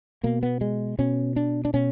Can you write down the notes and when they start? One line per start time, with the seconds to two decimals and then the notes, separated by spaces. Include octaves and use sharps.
0.23 B2 A#3
0.43 B3
0.61 G#3
0.99 B2 C#4
1.36 D4
1.65 D4
1.73 B2 C#4